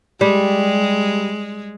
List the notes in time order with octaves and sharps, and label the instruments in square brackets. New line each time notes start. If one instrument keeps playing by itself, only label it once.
[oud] G3 [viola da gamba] G#3